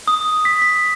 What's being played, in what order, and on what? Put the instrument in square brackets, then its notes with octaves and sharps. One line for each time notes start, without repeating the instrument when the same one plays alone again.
[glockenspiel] D#6
B6
B6